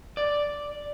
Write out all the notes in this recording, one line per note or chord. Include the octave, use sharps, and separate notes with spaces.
D5